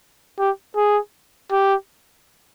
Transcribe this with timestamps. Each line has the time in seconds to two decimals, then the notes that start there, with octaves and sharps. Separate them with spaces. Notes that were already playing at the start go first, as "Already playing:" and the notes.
0.39 G4
0.76 G#4
1.52 G4